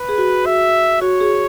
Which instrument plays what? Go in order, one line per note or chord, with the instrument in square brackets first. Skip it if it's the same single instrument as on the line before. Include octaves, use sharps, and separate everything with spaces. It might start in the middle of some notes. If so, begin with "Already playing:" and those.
Already playing: [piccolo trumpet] B4
[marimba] G#4
F#4
[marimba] F#4 [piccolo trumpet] E5
[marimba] F#4 [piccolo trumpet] C#5
[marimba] G#4